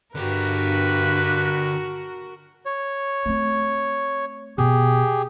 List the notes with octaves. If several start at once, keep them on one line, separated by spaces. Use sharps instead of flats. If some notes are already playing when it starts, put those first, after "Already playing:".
G2 D3 F#4 G4 A#4 B4
C#5
A3 C4
B2 G4 G#4